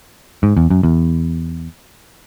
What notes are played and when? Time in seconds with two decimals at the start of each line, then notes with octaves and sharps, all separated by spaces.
0.43 G#2
0.57 E2
0.70 F#2
0.83 E2